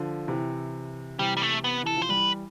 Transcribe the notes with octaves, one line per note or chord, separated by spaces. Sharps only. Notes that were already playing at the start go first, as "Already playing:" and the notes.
Already playing: D3 F3
C3 E3
C3 E3 G3
G3
A3
B3
E3 A4
F3
C5
E3 G3 B4